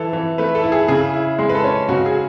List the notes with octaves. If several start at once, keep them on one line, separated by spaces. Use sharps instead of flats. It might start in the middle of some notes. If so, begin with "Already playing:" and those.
Already playing: E3 A4
E3
A3 B4
A4
E4
G#4
C#3 G#4
E4
G#3 G#4
B4
A4
C#4
C#3 F#4
G#4